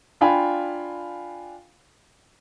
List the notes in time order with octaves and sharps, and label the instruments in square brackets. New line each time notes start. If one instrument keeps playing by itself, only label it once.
[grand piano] D4 F4 F5 G5 G#5 B5